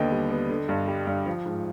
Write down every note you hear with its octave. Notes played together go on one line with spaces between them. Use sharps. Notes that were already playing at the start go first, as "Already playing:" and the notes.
Already playing: D#2 D3 B3 D#5 G5
G3
B3
D3
G2
G3
G2
F3
G#2